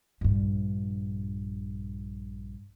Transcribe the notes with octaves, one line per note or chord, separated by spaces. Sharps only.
A#1 G2